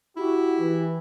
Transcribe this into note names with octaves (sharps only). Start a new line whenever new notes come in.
E4 F#4 G4
E3